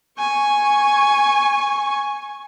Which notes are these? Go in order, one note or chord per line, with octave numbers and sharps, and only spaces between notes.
G#5 C#6